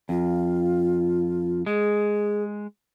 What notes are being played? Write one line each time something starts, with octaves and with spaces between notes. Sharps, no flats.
F2 F4
G#3 G#4